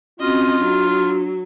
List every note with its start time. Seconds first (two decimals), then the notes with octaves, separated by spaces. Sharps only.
0.20 C4 C#4 F4 F#4 D#5
0.58 F#3 D4